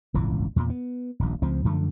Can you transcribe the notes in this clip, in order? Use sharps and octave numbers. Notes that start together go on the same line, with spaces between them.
D#1 G#1 C#2 E3
E2 A#2
B3
D#1 A#1
C#2 F3 C4
F#2 D3 F3 A3